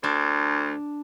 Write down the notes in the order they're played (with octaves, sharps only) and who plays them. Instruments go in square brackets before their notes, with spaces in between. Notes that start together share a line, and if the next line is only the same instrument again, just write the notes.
[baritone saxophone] D2 [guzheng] D4